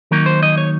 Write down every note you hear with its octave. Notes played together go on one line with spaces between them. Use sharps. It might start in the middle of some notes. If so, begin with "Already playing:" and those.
D#3 F#3 A#3 D#4 A#4
C5
D#5
C#5